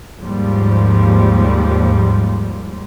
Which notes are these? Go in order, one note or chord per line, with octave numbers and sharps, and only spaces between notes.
D#2 G#2 F3 G3